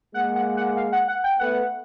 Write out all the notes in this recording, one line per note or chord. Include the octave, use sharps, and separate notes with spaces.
G#3 A#3 F#5
F#5
F#5
F5
F#5
F#5
G5
A3 B3 F#5